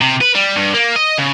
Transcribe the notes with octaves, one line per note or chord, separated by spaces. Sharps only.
C3
B4
G3
G2
A#3
D#5
C#3